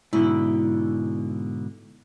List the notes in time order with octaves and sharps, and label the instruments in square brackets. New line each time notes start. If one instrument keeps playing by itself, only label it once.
[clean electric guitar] G#2 B2 D3 [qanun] E4